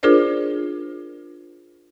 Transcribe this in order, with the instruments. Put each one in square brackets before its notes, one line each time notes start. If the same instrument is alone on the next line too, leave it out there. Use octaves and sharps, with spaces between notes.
[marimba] D4 F4 G#4 A#4 C5 D5